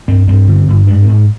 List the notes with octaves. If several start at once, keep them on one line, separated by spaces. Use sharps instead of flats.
G2 C4
G2 C4
D3
G2
G#2 D4
C4
G#2